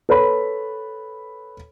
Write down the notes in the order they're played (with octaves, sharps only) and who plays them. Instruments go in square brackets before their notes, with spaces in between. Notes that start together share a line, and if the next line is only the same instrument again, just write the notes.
[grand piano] A4 B4 C#5 B5